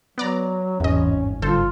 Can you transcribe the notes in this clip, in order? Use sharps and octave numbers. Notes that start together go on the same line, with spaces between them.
F#3 B3 D5 A#5
G#1 E2 G2 C#4 D#5
G1 F4 A4 C5